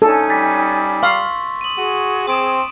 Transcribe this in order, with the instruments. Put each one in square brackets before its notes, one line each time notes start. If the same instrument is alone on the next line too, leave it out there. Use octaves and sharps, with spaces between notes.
[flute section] C#4 D#4 G#5 [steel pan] A4
[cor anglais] G3 [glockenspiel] A6 B6
[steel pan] F5 [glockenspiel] C6 C#6 E6
[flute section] D#6 [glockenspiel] D#7 F#7
[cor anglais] F#4 [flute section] G#4 [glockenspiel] D#7
[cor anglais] C4 [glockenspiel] D#6 D7 E7